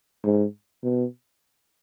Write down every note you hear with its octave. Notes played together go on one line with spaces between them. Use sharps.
G#2
B2